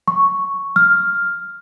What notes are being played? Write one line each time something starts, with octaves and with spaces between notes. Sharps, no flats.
C#6
F6